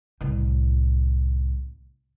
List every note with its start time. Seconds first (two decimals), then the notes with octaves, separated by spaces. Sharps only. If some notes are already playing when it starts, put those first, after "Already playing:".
0.21 C2 A2